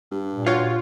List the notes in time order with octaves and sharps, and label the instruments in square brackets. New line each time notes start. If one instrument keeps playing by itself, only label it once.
[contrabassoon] G2
[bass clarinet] A#2
[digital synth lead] F4 [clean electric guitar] F#4 C#5 F5